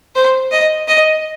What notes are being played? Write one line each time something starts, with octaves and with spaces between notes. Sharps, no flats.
C5
D#5
D#5